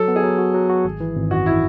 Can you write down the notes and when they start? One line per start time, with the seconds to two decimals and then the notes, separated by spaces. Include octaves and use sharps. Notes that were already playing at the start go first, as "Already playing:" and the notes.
Already playing: F#3 A4
0.08 B3
0.16 G#4
0.23 F#3
0.38 F#4
0.54 F#3
0.70 F#4
0.85 G#1
1.00 E3
1.15 G#1
1.30 F#2 F#4
1.46 E4